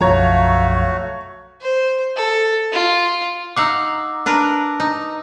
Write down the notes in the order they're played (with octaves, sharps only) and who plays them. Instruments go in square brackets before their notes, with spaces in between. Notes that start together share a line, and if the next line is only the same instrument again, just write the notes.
[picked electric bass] B1 F#2 F3 [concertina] A3 F#4 [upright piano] C#5 A#5 [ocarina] F5
[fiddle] C5
A4
F4
[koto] D#4 F5 F#5 [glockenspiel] D6 E6
[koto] D4 A#4 B4
D#4